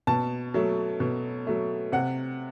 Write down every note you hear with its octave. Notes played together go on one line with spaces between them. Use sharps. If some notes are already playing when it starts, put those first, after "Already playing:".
B2 A5
F#3 A3
B2
F#3 A3
C3 F#5